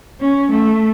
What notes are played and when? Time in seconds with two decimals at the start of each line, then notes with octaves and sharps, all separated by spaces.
0.20 C#4
0.52 A3